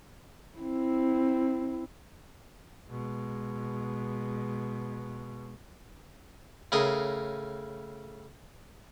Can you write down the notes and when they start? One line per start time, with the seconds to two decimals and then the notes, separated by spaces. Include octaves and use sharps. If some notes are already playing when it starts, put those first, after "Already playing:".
0.59 C4 E4
2.89 B2 G#3
6.72 A2 C#3 A#4 D#6